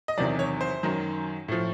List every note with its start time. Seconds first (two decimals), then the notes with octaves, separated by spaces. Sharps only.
0.08 D#5
0.17 E2 C3 D#3 F#3 D5
0.39 C#5
0.61 C5
0.83 F#2 D#3 F#3
1.48 A2 F3